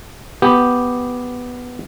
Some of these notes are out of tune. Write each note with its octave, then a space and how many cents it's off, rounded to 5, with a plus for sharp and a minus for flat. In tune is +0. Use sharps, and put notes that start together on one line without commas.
B3 +0 G4 +0